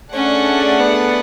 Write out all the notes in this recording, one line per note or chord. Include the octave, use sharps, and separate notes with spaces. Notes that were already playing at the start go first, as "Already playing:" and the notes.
A3 C#4 D4 G#4 D5 F#5
B3